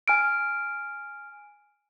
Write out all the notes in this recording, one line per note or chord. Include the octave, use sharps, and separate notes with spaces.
G#5 F6 D7